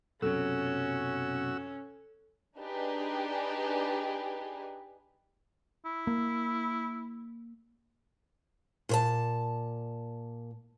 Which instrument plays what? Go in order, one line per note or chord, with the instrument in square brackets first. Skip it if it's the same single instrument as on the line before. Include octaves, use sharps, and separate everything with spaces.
[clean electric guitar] B1 F#2 C3 [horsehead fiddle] C#4 [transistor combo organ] F#4 E6 [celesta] A4
[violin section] D4 D#4 G4 G#4 B4
[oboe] E4
[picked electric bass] A#3
[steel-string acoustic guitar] A#2 C5 A5